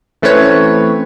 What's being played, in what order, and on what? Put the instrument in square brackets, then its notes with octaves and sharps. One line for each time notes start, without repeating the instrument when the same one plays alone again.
[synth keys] E3 A3 C4 C#4 B4 C#5